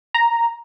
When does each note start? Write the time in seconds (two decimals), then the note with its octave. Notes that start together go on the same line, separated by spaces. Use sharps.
0.14 A#5